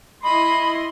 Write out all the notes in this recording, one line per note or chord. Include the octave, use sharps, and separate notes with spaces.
E4 D#5 B5 C6